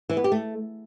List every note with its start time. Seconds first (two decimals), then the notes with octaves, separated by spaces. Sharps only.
0.09 E3
0.17 B3
0.24 G4
0.32 A3